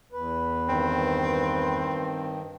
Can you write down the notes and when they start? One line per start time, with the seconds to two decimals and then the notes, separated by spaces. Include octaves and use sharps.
0.12 E2 B4
0.69 G2 D#3 C4